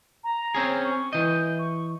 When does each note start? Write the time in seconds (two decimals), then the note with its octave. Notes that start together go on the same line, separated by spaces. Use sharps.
0.24 A#5
0.55 C4 C#4 G#4
0.84 C#6
1.13 E3 D#5 G6
1.59 C#6